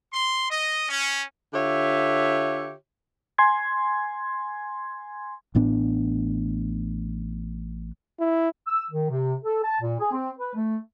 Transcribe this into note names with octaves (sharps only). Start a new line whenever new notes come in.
C6
D#5
C#4
D3 F4 G4 C#5 E5
G#5 C6 G#6
A1 A2 B3 D4
E4
E6
D#3
C3
A4
A5
A#2
G#4
C4
B4
A3